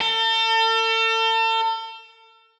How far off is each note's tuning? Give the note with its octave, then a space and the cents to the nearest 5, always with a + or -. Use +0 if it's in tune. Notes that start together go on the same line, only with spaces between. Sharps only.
A4 +40